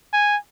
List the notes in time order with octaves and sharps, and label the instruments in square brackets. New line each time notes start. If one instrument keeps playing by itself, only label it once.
[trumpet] G#5